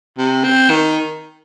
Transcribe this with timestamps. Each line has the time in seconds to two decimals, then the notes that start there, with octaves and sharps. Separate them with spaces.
0.18 C3
0.44 C4
0.70 D#3